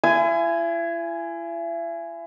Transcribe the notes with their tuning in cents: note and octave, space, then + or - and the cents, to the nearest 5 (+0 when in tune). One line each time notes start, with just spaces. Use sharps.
E4 +40 G#5 +0